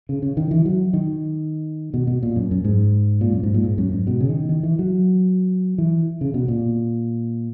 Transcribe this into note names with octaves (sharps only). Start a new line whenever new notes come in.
C#3
C#3
D#3
E3
F#3
D#3
B2
B2
A#2
F#2
F#2
G#2
A#2
F#2
G#2
A#2
G#2
F#2
G#2
B2
C#3
D#3
D#3
E3
F#3
E3
C#3
B2
A#2